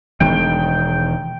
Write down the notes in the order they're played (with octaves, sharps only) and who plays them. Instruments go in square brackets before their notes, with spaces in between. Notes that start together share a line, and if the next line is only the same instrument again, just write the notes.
[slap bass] E1 D#3 G#3 [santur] G5